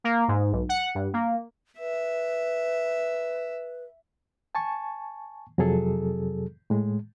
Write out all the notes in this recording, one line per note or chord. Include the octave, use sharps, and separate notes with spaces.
A#3
G#2
B1
F#5
G2
A#3
B4 E5
G#5 A5 C#6
F2 C3 F#3 G#4 A4
A2 G#3